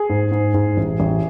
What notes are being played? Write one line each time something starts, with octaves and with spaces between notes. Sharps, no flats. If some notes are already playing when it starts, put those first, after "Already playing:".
Already playing: G#4
G#2
G#2
G#2
A1
A1